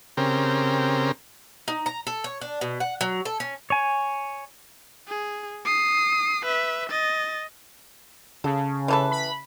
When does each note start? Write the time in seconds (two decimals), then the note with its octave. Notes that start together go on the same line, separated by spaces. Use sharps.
0.17 C#3 C4 G4 A#4
1.68 D#4
1.86 A#5
2.07 A4
2.24 C#5
2.41 D4
2.61 B2
2.80 F#5
3.01 F#3
3.25 A4
3.40 C#4
3.70 C#5 G#5
5.08 G#4
5.65 D#6 C7
6.45 B4 E5
6.90 D#5 A6
8.44 C#3 A4
8.88 E3 A4 B4
9.11 B5